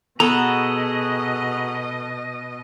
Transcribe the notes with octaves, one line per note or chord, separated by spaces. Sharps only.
B2 B3 F#4 G#4 A4 D#5 A#5